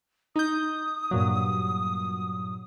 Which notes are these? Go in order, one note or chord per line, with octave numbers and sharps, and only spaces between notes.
D#4 D#6 G6
G2 A#2 F#3